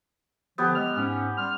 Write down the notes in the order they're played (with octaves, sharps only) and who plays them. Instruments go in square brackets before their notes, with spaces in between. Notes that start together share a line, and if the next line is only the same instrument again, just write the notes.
[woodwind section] D3 F3 [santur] B3 G4
[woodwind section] G#3 D#5 F6
G#2 C#4
G3 C6 F6